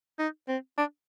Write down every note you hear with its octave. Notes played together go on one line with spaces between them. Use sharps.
D#4
C4
D4